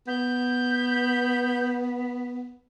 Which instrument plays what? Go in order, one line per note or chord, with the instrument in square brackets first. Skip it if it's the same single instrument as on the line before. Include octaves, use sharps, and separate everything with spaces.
[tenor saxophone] B3 [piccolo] G6